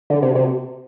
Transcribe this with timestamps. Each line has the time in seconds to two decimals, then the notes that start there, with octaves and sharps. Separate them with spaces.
0.10 D3
0.22 C3
0.35 C3